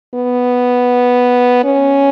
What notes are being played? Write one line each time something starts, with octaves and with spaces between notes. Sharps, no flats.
B3
C#4